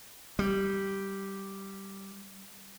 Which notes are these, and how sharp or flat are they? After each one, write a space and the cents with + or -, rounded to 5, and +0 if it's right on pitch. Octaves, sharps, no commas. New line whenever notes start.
G3 -5